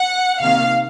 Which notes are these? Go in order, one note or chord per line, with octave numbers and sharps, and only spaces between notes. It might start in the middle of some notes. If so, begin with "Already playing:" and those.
Already playing: F#5
C3 D#3 A#3 F5